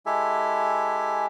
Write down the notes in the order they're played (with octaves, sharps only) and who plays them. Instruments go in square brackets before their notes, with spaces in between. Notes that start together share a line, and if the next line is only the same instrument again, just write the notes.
[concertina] G#3 E4 G4 A4 E5 G#5